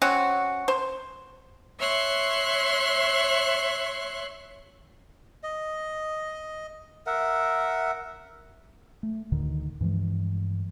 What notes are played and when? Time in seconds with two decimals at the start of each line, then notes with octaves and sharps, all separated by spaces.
0.02 C4 C#4 F#4 F#5
0.68 C5
1.79 C#5 E5 C6 F#6
5.43 D#5
7.06 A#4 E5 F#5
9.03 A3
9.32 D2 A2 D3 D#3
9.81 G2 E3 F3 G#3